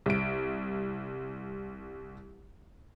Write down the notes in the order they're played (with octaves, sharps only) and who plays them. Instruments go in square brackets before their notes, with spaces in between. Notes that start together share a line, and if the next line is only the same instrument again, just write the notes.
[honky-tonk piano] C2 D7